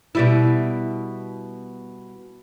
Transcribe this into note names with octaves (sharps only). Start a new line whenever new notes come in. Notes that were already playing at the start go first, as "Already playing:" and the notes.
B2 G3 E4